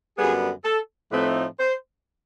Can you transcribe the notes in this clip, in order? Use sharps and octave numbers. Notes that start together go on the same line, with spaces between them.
F#2 D3 G3 B3 G#4
A4
A2 F3 A3 C4 D#4 B4
C5